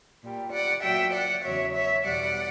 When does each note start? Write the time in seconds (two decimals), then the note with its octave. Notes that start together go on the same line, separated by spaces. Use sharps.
0.22 A#2 G3
0.51 D5 F#5
0.83 A#2 F#3 E5 G5
1.13 D5 F#5
1.43 E2 C#3 F#3 C#5 E5
1.74 C#5 E5
2.04 E2 B2 G3 D5 F#5